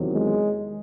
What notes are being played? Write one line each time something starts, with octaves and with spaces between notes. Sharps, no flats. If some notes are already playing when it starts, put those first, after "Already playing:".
Already playing: E2 C3 D#3 F#3
G#3